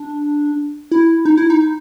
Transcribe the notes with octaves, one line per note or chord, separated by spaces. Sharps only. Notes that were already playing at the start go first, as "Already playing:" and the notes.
Already playing: D4
E4
D#4
E4
D#4